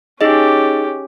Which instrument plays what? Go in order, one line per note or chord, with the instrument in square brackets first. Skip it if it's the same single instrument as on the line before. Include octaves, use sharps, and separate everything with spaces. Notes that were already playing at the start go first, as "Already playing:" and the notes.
[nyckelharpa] C#4 G4 [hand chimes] D#4 G#4 D#5